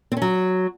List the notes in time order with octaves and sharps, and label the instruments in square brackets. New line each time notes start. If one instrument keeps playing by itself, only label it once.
[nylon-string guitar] C4
C#4
F#3